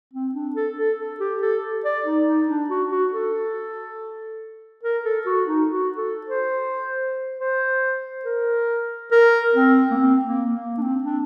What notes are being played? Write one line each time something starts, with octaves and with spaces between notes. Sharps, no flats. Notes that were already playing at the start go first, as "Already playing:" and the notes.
C4
D4
A4
A4
A4
G4
A4
D5
D#4
D#4
D4
F#4
F#4
A4
A#4
A4
F#4
D#4
F#4
A4
C5
C5
A#4
A#4
C4
A#3
C4
A#3
A#3
D4
C4
D4